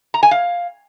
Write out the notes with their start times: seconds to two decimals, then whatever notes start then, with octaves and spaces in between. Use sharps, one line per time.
0.14 A#5
0.23 G#5
0.31 F5